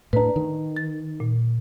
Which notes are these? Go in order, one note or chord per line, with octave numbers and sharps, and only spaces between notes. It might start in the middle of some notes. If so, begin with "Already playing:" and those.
A2 D4 B4 A#5
D#3
A6
A#2